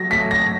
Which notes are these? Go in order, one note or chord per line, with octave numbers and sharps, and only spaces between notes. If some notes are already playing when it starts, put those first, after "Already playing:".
Already playing: F#3 A#6
A3 B6
A#6